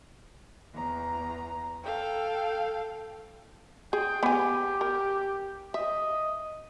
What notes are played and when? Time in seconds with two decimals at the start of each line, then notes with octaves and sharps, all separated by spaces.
0.75 E2 A#5
1.83 A4 F5 G5
3.93 G#4 G5
4.23 B3 G4 G#5
4.81 A#4
5.74 D#5 E5